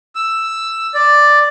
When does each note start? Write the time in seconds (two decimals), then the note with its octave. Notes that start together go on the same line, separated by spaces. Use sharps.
0.15 E6
0.95 D5